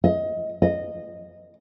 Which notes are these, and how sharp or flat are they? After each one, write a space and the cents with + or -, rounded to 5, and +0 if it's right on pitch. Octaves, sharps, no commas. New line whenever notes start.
D#5 +20
D#5 -10